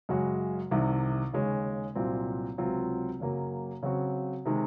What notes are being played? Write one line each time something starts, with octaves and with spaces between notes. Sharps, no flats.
F#2 C#3 G#3 C#4 F#4
C2 C3 D#3
D#2 C#3 G#3 C#4
C2 A#2 F#3 C4
C#2 C3 F#3 C4 F4
F#2 C#3 F#3 A#3
C#3 F#3 C4 F#4
C3 D#3 G#3